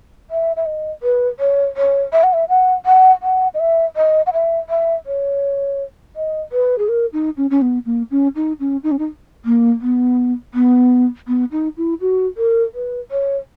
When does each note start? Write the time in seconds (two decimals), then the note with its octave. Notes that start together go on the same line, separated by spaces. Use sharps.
0.31 E5
0.56 E5
0.66 D#5
1.03 B4
1.40 C#5
1.77 C#5
2.13 E5
2.23 F#5
2.33 E5
2.49 F#5
2.86 F#5
3.23 F#5
3.54 D#5
3.60 E5
3.96 D#5
4.27 F#5
4.33 E5
4.69 E5
5.06 C#5
6.16 D#5
6.52 B4
6.78 G#4
6.89 A#4
7.13 D#4
7.37 C#4
7.50 C#4
7.62 B3
7.86 A#3
8.11 C#4
8.36 D#4
8.60 C#4
8.83 D#4
8.92 C#4
8.99 D#4
9.45 A#3
9.81 B3
10.54 B3
11.28 B3
11.52 D#4
11.77 E4
12.01 F#4
12.37 A#4
12.74 B4
13.11 C#5